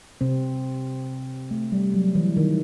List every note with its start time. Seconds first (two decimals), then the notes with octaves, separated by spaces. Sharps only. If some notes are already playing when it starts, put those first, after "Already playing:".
0.21 C3 C4
1.51 A3
1.72 G3
1.94 F#3
2.15 E3
2.37 D#3